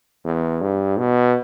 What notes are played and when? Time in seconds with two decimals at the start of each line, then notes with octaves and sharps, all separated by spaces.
0.25 E2
0.62 G2
0.98 B2